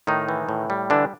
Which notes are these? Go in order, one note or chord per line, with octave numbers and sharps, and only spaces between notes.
A2 D#3 D#4
E3
A2
G3
D3 E3 D4